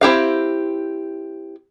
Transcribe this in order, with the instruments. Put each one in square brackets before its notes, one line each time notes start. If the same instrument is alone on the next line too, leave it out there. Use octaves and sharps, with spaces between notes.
[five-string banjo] C4 E4 G4 F5